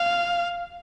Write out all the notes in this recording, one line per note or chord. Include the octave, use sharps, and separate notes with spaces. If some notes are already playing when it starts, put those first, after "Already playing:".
Already playing: F5